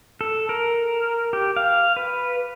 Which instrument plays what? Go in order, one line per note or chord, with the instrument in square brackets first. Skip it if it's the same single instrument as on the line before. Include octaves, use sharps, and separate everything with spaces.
[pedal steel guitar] A4
A#4
G4
F5
B4